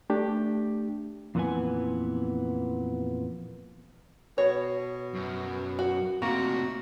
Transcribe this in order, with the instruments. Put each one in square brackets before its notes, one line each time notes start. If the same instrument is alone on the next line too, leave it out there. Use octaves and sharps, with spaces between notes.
[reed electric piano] A3 D4 G4
[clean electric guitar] F2 A#2 E3 B3 B4 G#5
[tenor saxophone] B2 [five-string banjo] C#5
[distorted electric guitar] F#2
[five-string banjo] F#4
[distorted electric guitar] C3 A3 [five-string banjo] A#3 [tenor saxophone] F#4